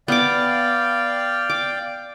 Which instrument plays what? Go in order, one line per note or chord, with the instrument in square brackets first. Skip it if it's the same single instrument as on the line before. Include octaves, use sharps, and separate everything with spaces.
[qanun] B3 D6 [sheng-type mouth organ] D5 F5 G5
[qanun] D6